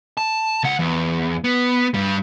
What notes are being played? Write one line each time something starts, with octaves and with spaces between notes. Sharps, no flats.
A5
C#2 F#5
E2
B3
G2 G3